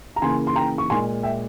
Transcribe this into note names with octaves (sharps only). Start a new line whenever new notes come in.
A#5
C#3 E3 A#3 G#5 C6
C6
G5 A#5
C#6
A#2 G#3 G#5 C6
E5 G5